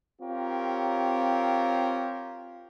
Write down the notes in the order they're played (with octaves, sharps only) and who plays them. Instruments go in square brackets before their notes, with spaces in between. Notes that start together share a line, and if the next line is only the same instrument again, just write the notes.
[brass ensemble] C4 F4 G4 A#4 C#5